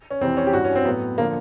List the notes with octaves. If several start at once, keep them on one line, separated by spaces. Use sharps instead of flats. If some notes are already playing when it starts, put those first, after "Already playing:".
C#4
F2 C3 E3 C4
C#4
G4
G2 E3 F#4
C#4
C4
A2 F#3 B3
D3 F3 A#3